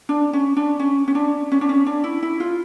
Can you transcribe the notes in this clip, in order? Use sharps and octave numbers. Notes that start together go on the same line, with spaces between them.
D4
C#4
D4
C#4
C#4
D4
C#4
D4
C#4
D4
E4
E4
F4